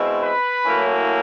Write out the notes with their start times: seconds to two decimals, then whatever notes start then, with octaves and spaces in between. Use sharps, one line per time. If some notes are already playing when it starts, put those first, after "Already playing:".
Already playing: B2 G#3 C4 E4
0.22 B4 B5
0.66 A2 F#3 A#3 C#4 E4